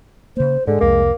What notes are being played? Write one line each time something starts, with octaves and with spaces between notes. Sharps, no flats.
C#3 A#3 C5
G#2 D3 G#3
C2 F2 A#3 D4